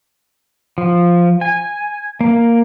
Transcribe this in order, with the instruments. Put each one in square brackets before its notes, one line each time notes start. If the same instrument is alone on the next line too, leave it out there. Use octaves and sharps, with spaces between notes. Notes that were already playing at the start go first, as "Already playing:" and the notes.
[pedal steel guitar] F3
G#5
A#3